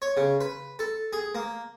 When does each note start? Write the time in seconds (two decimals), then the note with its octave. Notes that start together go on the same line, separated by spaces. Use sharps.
0.02 C#5
0.17 C#3
0.41 B4
0.79 A4
1.13 G#4
1.35 A#3